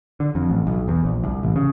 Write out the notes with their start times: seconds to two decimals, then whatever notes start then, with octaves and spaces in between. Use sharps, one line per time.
0.20 D3
0.35 F2
0.50 A1
0.67 B1
0.88 E2
1.04 A#1
1.24 C2
1.43 A1
1.56 C#3